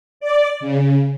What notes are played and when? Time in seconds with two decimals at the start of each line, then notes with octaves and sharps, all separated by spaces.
0.20 D5
0.60 C#3